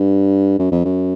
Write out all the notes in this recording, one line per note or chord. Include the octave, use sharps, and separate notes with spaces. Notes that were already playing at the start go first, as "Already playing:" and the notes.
Already playing: G2
F#2
F2
F#2